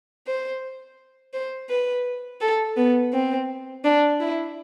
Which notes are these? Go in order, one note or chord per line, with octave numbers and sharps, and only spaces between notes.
C5
C5
B4
A4
B3
C4
D4
E4